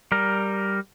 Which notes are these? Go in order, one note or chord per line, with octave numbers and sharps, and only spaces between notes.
G3 A#4